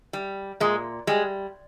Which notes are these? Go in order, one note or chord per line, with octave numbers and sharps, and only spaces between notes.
G3
A#2 G#3
G3 G#3